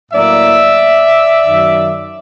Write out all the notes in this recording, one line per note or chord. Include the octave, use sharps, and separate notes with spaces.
A2 F#3 A#3 D5 E5
F#2 D#3 F#3